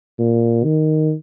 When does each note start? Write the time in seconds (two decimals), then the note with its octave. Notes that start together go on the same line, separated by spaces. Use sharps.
0.19 A#2
0.64 D#3